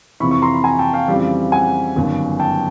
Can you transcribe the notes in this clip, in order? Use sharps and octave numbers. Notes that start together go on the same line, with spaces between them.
F2 C3 E3 B5 C#6
C#6
A#5 C6
B5
G#5 A#5
G5 A5
F5 G5
F2 C#3 E3 G3 C4
F#5 G#5
G1 F#2 D#3
G5 A5